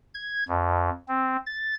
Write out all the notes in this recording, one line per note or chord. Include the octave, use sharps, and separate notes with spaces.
G#6
F2
C4
A6